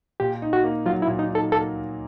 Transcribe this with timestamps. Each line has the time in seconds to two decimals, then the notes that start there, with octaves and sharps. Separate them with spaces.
0.20 A#2 G4
0.42 D#4
0.53 F#4
0.64 A#3
0.86 F#3 F4
1.02 E4
1.07 A#2
1.19 D#4
1.31 D#4 A4
1.52 A#3 A4